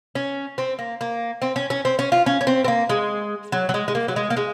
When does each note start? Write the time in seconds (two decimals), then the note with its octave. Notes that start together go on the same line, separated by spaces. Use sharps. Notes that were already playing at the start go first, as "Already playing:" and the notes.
0.15 C#4
0.58 C4
0.79 A#3
1.01 A#3
1.42 C4
1.56 C#4
1.70 C#4
1.85 C4
1.99 C#4
2.12 F4
2.26 C#4
2.41 C#4
2.47 C4
2.64 C4
2.68 A#3
2.90 G#3
3.52 F#3
3.69 F#3
3.74 G#3
3.88 G#3
3.95 A#3
4.08 F#3
4.16 G#3
4.30 A#3
4.37 G#3